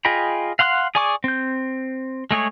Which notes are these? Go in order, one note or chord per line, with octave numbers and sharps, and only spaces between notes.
F4 G#4 D#5 G5 B5
F5 F#5 C6 D#6 F#6
G#4 D5 G#5 C#6 D6
C4 G6
G#3 A3 G#4 C#5